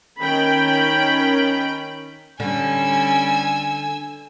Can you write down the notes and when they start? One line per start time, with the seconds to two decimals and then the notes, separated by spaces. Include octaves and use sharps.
0.20 D#3 C#4 G5 B5
2.40 D3 G3 C#4 G#5 E6